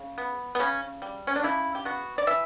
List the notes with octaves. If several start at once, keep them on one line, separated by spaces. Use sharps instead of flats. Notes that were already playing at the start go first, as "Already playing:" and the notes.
Already playing: C#3
B3
B3
C#3 C#4
G3
C#4
D4
C#3 E4
G4
B3 F#4
D5
E3 E5